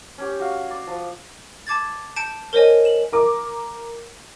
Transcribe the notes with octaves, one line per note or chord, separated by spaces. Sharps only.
C#4 G4
F#4 F5
D5
F3
A5 D6 G#6 A6
A5 G6 C#7 D7
A#4 C5 C#5 D#5 G#5
E7 F#7
A#4 D6